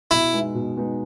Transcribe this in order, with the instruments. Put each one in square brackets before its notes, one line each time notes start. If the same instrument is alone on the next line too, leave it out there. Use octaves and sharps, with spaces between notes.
[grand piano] B2 [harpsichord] E4
[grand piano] G#3 B3 D#4
B2
G#3 B3 D#4